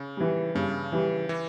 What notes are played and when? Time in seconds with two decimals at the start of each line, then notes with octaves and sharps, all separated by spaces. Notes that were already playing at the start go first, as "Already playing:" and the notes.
Already playing: C#3
0.17 E3 G3
0.55 G2 C#3
0.92 E3 G3
1.29 E3